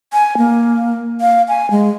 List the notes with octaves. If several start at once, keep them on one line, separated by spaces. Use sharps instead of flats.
G#5
A#3
F5
G#5
G#3